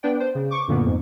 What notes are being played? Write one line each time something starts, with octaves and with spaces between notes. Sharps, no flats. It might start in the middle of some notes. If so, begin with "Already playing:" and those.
B3 D4 B4 D5 G5
C5
C#3
C#6 D6
F#2 A#2 D3 A#3 B3
F2 G#2